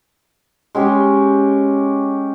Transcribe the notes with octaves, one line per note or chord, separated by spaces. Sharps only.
G#3 C#4 G4